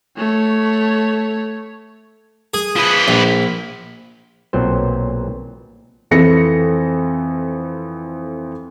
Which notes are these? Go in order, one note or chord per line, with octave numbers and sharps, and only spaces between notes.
A3 C#5
G#4
F3 B4
A#1
B1 A#2 F#3 B3 C4 C5
F2 E3 A4 A#6 C#7